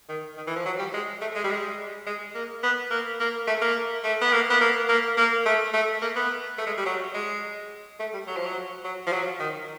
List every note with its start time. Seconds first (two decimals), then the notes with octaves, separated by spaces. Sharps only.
0.09 D#3
0.37 D#3
0.47 E3
0.56 F3
0.65 F#3
0.79 G3
0.93 G#3
1.21 A3
1.35 G#3
1.44 G3
1.51 G#3
2.06 G#3
2.34 A#3
2.63 B3
2.91 A#3
3.20 A#3
3.47 A3
3.62 A#3
4.04 A3
4.21 B3
4.32 A#3
4.50 B3
4.61 A#3
4.89 A#3
5.17 A#3
5.46 A3
5.74 A3
6.02 A#3
6.16 B3
6.58 A3
6.67 G#3
6.77 G3
6.86 F#3
7.14 G#3
7.99 A3
8.13 G3
8.27 F#3
8.37 F3
8.46 F#3
8.84 F#3
9.07 F3
9.13 F#3
9.40 D#3